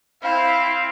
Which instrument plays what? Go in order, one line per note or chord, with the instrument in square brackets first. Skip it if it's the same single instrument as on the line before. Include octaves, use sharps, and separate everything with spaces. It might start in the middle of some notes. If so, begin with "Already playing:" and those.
[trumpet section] C4 F5 [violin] E4